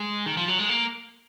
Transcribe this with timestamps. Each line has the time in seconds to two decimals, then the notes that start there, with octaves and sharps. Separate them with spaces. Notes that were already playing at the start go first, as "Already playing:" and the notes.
Already playing: G#3
0.26 D#3
0.37 F3
0.48 F#3
0.59 G#3
0.69 A#3